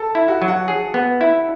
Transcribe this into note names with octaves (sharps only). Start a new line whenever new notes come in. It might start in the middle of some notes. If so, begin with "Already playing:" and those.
Already playing: A4 A5
E4
F#4 F#5
F#3
F#4 F#5
G#4
B3
E4